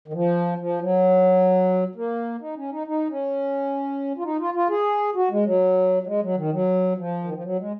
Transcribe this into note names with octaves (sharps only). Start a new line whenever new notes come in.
D#3
F3
F3
F#3
A#3
D#4
C#4
D#4
D#4
C#4
F4
D#4
F4
F4
G#4
F#4
G#3
F#3
F#3
G#3
F#3
D#3
F#3
F3
D#3
F3
F#3
G#3